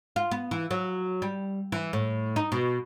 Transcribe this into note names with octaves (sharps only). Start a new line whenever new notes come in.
F4
B3
E3
F#3
G3
E3
A2
D#4
B2